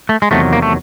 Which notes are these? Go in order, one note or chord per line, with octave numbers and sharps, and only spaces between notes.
A3
G#3
E2 C3 D#3 F#3 A3
A#3
A3